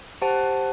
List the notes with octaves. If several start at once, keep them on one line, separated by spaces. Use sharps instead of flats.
G4 C5 F#5 A5